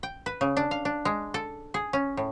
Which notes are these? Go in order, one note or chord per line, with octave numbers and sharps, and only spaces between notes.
G5
B4
C#3
D4
F5
D4
G#3
A4
G#4
C#4
A2